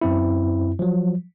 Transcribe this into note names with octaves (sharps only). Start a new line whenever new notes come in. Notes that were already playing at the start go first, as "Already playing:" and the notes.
F#2 C4 E4
F3 F#3